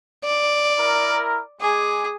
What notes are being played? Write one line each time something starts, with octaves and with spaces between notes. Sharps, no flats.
D5
E4 A#4
G#3 G#4 G#5 D6